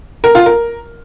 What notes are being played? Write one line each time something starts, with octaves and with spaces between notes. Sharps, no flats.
A#4
F4
A#4